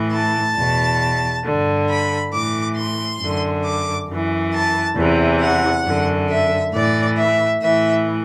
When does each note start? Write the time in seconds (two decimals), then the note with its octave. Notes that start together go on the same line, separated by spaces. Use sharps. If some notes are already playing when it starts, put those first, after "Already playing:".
Already playing: A2 E3
0.12 A5
0.56 E2 B2
1.44 G2 D3
1.88 B5
2.33 A2 E3 D6
2.76 C6
3.20 F#2 D3
3.64 D6
4.08 F#2 E3
4.53 A5
4.96 E2 C3 E3
5.41 F#5
5.85 F#2 D3
6.29 E5
6.72 A2 E3 D5
7.17 E5
7.61 A2 E3 E5